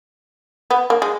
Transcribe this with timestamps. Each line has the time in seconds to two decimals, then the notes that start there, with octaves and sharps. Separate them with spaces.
0.71 B3
0.90 A#3
1.02 G#3